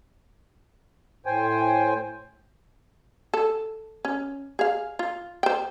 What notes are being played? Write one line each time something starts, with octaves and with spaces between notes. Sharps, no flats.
A2 C5 G5 G#5
A4
C#4
G#4 F5
F4
C5 G5